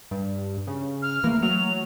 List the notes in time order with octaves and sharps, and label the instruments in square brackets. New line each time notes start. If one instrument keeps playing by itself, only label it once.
[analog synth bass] G2
C#3
[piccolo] F6
[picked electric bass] E3 A3 [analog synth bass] A#3
[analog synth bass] F#3 [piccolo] F7